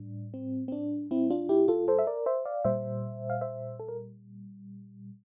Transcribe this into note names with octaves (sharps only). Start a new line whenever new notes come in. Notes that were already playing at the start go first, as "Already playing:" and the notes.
Already playing: A2 G3 D4
C4
C4
D4
C4 E4
D4 F4
E4 G4
F4 A4
A4 C5
E5
A#4 D5
C5 E5
D5 F5
A#2 G3 C5 E5
F5
C5 E5
A4
A#4